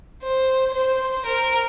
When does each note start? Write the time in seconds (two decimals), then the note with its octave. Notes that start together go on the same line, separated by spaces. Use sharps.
0.23 C5
0.74 C5
1.26 A#4